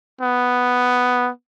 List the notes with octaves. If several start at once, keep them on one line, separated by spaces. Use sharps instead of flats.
B3